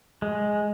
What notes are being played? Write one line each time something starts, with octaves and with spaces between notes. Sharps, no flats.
G#3